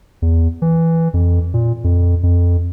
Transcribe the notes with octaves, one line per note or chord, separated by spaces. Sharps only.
E2
E3
F2
A#2
F2
F2